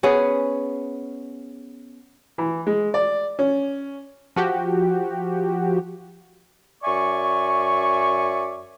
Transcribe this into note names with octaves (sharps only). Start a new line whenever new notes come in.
B3 C#4 G#4 B4
E3
G#3
D5
C#4
F3 F#4 G4
F#2 D5 E5 G#5 C#6